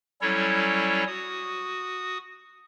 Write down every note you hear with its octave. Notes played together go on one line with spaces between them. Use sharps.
F#3 G3 C#4 E4 A4 C#5
F#4 D#6